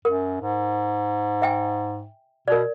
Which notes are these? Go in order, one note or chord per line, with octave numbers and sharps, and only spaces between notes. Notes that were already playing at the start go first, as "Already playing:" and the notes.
F#2 A#4
G#2
E5 G5 G#5
B2 A#4 D5